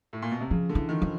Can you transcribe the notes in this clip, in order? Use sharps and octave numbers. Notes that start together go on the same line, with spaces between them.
A2
A#2
B2
C3
C#3 F3
D3
E3
D#3
F3